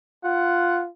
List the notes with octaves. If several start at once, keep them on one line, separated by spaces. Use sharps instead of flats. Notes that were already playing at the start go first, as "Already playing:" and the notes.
F4 F#5